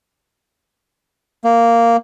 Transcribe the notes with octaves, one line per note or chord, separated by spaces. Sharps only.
A#3